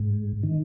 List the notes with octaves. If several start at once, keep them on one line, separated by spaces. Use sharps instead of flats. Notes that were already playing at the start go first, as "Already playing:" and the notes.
Already playing: G#2
D#3